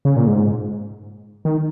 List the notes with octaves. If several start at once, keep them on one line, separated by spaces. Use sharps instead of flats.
C#3
A#2
G#2
D#3